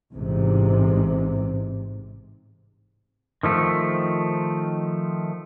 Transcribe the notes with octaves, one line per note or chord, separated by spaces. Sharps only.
A1 G#2 C3
D#3 F3 A3